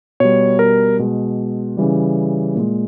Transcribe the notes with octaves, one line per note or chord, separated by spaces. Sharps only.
B2 G3 C#5
A#4
B2 G#3
C#3 E3 G3
A#2 G#3